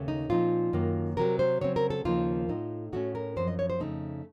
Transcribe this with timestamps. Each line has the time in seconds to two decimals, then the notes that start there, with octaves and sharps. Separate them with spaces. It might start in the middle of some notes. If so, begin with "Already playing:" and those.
Already playing: D#2 C#3 A3
0.08 D#4
0.30 A#2 F3 C4 D#4 F4
0.73 F#2 D#3 A#3
1.17 C3 F#3 C4 A#4
1.39 C5
1.61 C#3 F#3 C4 C#5
1.76 A#4
1.90 A4
2.05 D#2 C#3 F3 A#3 D#4 F4
2.49 A2 A3 D#4
2.93 A2 A3 C#4 F#4
3.15 A#4
3.36 F#2 F3 C4 C5
3.48 D#5
3.59 C#5
3.70 C5
3.80 F2 C#3 A3 D#4